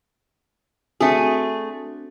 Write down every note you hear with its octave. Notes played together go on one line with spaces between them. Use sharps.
A3 C4 D4 F#4 G#4